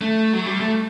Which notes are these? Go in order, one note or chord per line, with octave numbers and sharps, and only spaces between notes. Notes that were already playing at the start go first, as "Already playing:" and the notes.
A3
F#3
G3
A3